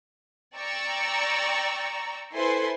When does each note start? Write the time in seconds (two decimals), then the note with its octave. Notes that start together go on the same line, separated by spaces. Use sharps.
0.56 D5 G5 A#5 C#6 E6
2.34 E4 A4 B4 C5 G#5 C6